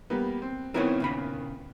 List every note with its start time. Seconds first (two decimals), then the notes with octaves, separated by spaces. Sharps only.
0.10 G3 A#3 B3
0.42 C4
0.74 D#3 B3 C4 E4 A#4 C#5
1.00 A#2 C#3 B5